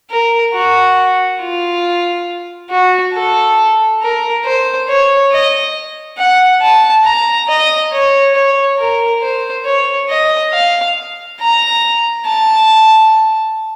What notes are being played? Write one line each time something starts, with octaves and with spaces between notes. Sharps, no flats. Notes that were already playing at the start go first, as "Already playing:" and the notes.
A#4
F#4
F4
F#4
A4
A#4
C5
C#5
D#5
F#5
A5
A#5
D#5
C#5
C#5
A#4
C5
C#5
D#5
F5
A#5
A5